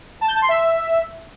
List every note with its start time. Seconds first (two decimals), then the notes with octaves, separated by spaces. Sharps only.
0.21 A5
0.28 G6
0.35 A5
0.42 C6
0.49 E5